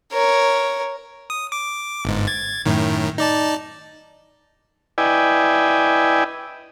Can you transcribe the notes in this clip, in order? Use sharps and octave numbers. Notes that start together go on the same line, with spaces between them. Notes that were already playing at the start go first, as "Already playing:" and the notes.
A#4 C#5
D#6
D6
G1 G#2
G#6 A6
F#2 A2 D#3
D#4 D5 A5
E4 B4 D5 D#5 G5 G#5